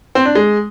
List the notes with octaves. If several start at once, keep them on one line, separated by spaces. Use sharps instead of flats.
C4
D4
G#3